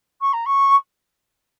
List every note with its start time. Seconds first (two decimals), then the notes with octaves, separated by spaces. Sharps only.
0.21 C#6
0.33 A#5
0.46 C#6